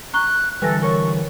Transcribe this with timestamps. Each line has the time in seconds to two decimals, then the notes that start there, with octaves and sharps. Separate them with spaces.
0.14 A#5 C#6 F#6 G7
0.62 D3 E3 G3 A4 B4 G#5 A#6
0.82 A#4 C#5 C#6